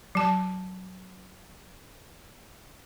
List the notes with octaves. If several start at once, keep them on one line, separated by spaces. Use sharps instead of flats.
F#3 A5